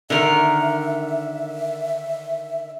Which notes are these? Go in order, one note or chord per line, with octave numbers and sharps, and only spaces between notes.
D3 D#3 A#4 E5